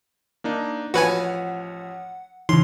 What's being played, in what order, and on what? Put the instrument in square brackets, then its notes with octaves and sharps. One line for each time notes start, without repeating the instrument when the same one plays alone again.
[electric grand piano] A#3 D4 D#4
[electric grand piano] A1 F3 C#5 [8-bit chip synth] F#4 B4 G#5
[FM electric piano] F#5
[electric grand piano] A#1 [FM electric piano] C#3 E3 [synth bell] D#4 [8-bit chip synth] C6